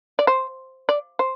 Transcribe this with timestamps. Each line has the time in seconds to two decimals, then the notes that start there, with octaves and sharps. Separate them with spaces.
0.19 D5
0.27 C5
0.89 D5
1.19 C5